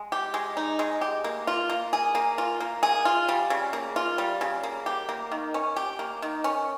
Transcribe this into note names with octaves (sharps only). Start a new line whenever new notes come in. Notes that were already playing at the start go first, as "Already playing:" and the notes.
Already playing: G#3
G4
G#3
D#4
G#3
G4
A#3
F4
A#3
G#4
A#3
F4
A#3
G#4
F4
G3
C#3
A#3
F4
G3
C#3
A#3
G4
A#3
D#3
C#4
G4
A#3
D#3
C#4